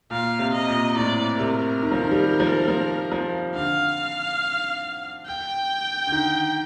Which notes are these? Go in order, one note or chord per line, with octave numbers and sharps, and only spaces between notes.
A#2 F5
C3
D#5
A#2
A2 D5
C3 A#4
D#3
F3
D#3
G3
F3
F3
F3
D3 F5
G5
D3
D#3